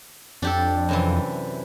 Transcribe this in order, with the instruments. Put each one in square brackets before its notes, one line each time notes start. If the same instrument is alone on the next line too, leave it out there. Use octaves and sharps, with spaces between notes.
[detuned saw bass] F2 [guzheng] D4 G4 A4
[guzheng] F#2 C3 E3